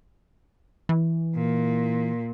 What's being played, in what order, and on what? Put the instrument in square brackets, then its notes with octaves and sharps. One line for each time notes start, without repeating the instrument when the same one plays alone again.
[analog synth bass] E3
[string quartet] A#2